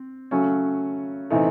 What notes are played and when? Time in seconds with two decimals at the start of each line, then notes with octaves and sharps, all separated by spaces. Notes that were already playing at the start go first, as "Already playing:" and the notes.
Already playing: C4
0.31 C#3 F#3 A3 C#4
1.30 C3 E3 A3 D#4